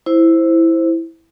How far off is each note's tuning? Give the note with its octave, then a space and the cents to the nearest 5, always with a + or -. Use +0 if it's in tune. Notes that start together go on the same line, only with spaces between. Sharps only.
E4 +0 C5 +0